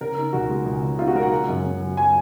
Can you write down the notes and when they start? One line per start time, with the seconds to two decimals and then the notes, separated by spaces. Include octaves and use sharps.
0.01 C#3 A#4
0.18 D#4
0.33 C#2 F#4
0.50 G#3
0.66 C#2
0.83 C#3
0.99 D#4 F4
1.08 F#4
1.15 G#3 A#4
1.23 F#5
1.32 C#3
1.48 F#2
1.64 C#3
1.81 F#3
1.96 F#3 G#5